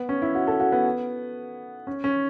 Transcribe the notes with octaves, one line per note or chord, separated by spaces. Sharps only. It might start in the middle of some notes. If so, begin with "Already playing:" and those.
Already playing: B3
C#4
E4
F#4
A4
F#4
B3
C#4
C#4